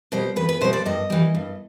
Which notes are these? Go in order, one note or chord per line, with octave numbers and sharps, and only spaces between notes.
B2 G3 C5
E2 B4
B4
B2 G3 C5
D5
G2 D#5
E3 G3
G2